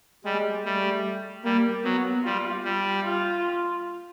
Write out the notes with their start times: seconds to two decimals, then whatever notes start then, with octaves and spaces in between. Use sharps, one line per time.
0.25 G3 G#3
0.64 G3 A3
1.44 G3 A#3
1.84 F#3 B3
2.24 G3 F4
2.64 G3
3.04 F4